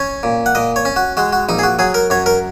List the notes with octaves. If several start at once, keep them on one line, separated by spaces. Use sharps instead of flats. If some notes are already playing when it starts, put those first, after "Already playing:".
Already playing: C#4 C#5
A#2
F#5
A#2 D#5
C#5
C#4
F#4
G#3 F#4
F#4
A#1 D#4
G#4
F#4
F#3 G#4
A#4
F#2 C#5
A#4